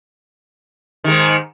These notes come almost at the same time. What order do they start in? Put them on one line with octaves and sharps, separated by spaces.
D#3 G#3 G#2